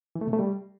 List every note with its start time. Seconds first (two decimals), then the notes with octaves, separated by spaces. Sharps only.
0.15 E3
0.21 A3
0.27 C3
0.33 A3
0.39 G3